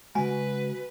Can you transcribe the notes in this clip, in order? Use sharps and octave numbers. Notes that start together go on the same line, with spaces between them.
C#3 G#3 F#4 B4 G#5